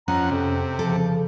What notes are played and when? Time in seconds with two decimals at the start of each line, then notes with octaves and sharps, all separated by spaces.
0.08 F2 C#4 F#5 A#5
0.31 F2 C3
0.79 C#3 E3 F3 A4